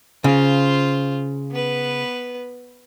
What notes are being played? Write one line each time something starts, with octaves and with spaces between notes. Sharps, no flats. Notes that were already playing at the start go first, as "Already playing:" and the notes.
C#3 F4 C5
B3 B4